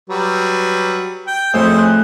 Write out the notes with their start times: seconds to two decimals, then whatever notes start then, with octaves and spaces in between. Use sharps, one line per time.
0.10 F#3 G3 B4
1.27 G5
1.53 F2 A2 G#4 C5
1.78 F#6 G6